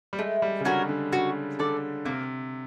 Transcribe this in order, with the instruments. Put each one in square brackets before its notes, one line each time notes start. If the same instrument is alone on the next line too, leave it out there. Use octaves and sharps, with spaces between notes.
[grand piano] G3
[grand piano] G#3 [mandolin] A3
[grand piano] G3
C#3
[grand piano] D3 [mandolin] C#4 F#4 A#4
[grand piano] D3
[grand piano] C#3 [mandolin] F#4
[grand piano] D3 [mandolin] A4 D5
[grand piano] C3 [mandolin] A#3